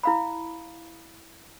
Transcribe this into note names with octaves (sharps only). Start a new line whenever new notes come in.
E4 F5 B5